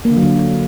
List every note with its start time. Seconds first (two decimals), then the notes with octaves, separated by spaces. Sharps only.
0.05 A#3
0.11 D3
0.17 F#3
0.22 D3